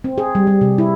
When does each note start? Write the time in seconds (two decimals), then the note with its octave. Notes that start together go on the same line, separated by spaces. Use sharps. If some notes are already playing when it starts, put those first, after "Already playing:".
0.04 C4
0.18 G#4
0.35 G3
0.47 G3
0.61 C3
0.78 E4